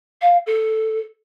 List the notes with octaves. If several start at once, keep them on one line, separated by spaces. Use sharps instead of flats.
F5
A4